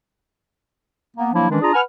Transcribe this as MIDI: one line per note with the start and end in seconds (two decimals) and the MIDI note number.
1.16 1.32 58
1.16 1.32 59
1.34 1.49 53
1.34 1.49 54
1.34 1.49 58
1.34 1.49 62
1.34 1.49 64
1.50 1.60 51
1.50 1.60 52
1.50 1.60 56
1.50 1.60 61
1.50 1.60 62
1.62 1.74 62
1.62 1.74 65
1.62 1.74 68
1.62 1.74 74
1.62 1.74 82
1.74 1.82 71
1.74 1.82 78
1.74 1.82 80
1.74 1.82 89